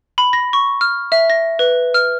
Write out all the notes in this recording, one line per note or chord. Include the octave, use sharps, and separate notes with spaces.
B5
A#6
C#6
F6
E5
A#6
B4
F6